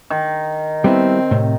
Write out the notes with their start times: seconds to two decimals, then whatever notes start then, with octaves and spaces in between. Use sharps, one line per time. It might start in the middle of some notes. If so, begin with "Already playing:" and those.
0.10 D#3
0.84 G3 B3 C4 E4
1.31 A2 C3